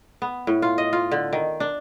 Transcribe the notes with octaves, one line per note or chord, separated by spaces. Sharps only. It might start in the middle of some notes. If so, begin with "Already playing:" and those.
B3
A2
F4
D#5
F4
D3
D#3
D4